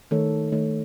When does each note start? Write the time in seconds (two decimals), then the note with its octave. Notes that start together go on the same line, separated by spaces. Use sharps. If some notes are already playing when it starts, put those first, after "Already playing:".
0.11 D#3 A3 D#4 A4 C#5
0.52 D#3 A3 D#4 A4 C#5